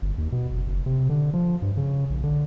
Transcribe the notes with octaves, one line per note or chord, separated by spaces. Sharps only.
G1
D#2
B2
F#1
F#1
C3
D3
F3
G2
C#3
A#1
D3